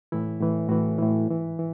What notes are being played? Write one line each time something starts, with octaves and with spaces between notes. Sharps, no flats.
A2 E3 E4
A2 E3
A2 E3 F#4
A2 E3
G#2 E3
E3